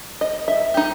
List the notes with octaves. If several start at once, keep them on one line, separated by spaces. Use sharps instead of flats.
D#5
E5
D#4 G4